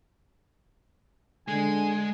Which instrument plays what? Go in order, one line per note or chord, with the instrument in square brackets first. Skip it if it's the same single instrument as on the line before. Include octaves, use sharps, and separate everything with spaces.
[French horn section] D3 [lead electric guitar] G#3 [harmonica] G#5